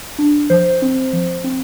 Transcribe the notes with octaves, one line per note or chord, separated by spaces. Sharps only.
D4
F3 C5
C4
F3
C4